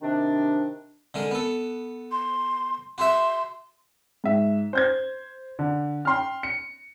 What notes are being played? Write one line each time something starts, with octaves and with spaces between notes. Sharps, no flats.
C3 D#3 D4
D3 G#3 A#4
B3 A4
C6
F#4 G#4 E5 C6
G#2 E5
C5 G6 G#6
D3
G5 C6 F6
C#7